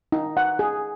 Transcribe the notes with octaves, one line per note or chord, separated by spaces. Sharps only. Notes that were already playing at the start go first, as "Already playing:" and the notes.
D#4
F#5
G#4